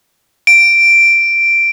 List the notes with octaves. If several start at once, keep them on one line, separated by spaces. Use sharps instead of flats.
D7